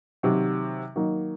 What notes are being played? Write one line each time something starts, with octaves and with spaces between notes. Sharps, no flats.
C3 D#3 F#3
D#3 F#3 A#3 D#4